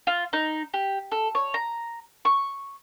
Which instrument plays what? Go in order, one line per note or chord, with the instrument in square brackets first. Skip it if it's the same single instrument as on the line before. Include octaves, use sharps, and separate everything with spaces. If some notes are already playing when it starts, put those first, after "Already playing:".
[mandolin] F4
D#4
G4
A4
C#5
A#5
C#6